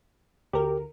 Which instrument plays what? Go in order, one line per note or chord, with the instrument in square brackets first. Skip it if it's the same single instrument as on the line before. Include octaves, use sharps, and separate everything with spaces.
[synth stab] D2 A#4 [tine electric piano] G4